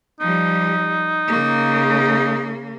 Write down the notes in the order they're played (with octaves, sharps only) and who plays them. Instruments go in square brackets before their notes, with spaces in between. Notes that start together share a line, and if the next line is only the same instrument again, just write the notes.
[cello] F3 G3 [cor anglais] D#4
[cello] C#3 A#3